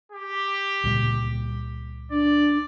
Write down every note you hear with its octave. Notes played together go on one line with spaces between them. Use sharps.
G4
C#2 A#2 G3
D4 D5